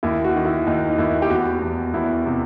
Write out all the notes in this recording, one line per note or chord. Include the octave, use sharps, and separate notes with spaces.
D#2 E4
F#4
D#3
E4
D#2 D#4
D#4
D#2 E4
G4
E2 F#4
E2
E2 E4
C3